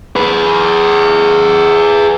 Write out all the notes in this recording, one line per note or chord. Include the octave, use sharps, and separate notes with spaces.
G#4 B4